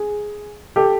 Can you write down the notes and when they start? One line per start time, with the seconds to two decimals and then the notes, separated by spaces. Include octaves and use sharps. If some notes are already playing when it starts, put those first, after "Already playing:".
Already playing: G#4
0.76 G4 A4